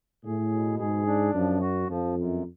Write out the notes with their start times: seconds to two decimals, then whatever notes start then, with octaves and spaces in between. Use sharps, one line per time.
0.25 A2 G#4
0.52 B2
0.79 G#2 G#4
1.07 D4
1.34 F#2 F3
1.61 F#4
1.89 F2 F3
2.17 F#2